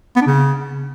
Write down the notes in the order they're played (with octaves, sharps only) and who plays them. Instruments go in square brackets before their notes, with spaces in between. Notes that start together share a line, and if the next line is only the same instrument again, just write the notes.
[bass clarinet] B3
D4
C#3